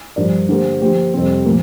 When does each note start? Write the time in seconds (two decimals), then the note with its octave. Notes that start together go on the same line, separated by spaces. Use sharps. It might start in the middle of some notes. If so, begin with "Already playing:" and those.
0.16 G2 F3 D4 A#4 D5
0.49 D3 A#3 G4 C5
0.81 F3 A#3 G4 C5
1.14 F2 C3 G3 C4
1.45 A#2 F3 A#3